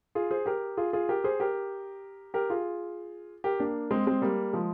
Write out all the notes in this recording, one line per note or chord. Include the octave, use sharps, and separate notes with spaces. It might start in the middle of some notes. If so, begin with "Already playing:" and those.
F4 G#4
G#4 C5
G4 A#4
F4 G#4
F4 G#4
G4 A#4
G#4 C5
G4 A#4
G4 A#4
F4 G#4
G4 A#4
A#3 D4
G#3 C4
G#3 C4
G3 A#3
F3 G#3